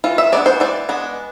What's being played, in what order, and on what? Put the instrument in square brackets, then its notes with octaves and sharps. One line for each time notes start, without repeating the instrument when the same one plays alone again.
[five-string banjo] E3 F4
E5
G#3 B3 D4 D5
C5
E3 D5
G#3 B3 D4